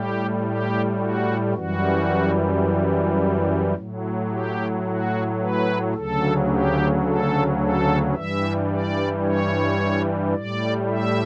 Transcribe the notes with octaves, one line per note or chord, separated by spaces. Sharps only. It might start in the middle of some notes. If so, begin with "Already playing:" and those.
Already playing: A2 G3 G4
G4
F#4
F#2 E3 G3 F#4
A2 F#3
G4
F#4
B4
D2 C#3 F#3 A4
G4
A4
A4
G2 E3 G3 E5
D5
C#5
A2 G3 D5
E5